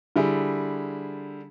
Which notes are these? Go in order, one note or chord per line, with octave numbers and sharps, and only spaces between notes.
D3 G3 E4 G#4